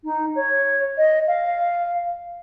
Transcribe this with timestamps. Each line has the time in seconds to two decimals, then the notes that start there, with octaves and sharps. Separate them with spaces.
0.04 D#4
0.35 C#5
0.98 D#5
1.28 F5